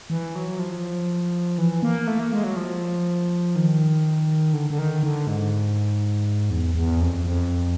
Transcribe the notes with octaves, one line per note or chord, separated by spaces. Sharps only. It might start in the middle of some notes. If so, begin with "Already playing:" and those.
E3
F#3
F3
E3
A#3
A3
A#3
G#3
F#3
F3
D#3
D3
D3
D#3
D3
G#2
E2
E2
F2
F2